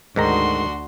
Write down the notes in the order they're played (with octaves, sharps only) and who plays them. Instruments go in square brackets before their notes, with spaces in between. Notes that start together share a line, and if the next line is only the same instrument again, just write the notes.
[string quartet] D2 F#4 C6 [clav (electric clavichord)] G#2 D#3 A#5